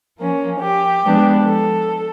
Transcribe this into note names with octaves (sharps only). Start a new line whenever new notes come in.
F3 A#3 C#4
G4
F3 G#3 B3 D4
A4